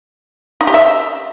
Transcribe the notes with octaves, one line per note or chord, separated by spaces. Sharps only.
D#4
G4
E5